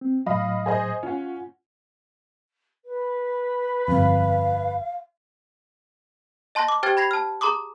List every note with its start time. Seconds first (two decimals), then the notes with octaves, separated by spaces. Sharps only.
0.01 C4
0.26 A2 F#3 D#5 F5 B5
0.66 G#4 C5 D#5
1.03 C#4 F4 F#5
2.85 B4
3.88 G1 F2 F5
6.55 D#5 A5 C6 F#6 A#6
6.68 D6
6.83 G4 C5 G5 F6 G#6 A6
6.97 B5 G#6 A#6 C7 F7
7.11 A5 F6
7.41 G#4 A#5 C6 D6 D#6